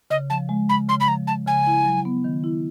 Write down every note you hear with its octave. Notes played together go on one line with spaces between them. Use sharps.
C#3 D#5
F3 A5
G#3
C#3 B5
C#3 C6
B5
F3 A#5
G#3 A5
C#3 G#5
E4
F#3
B3
D#3
E4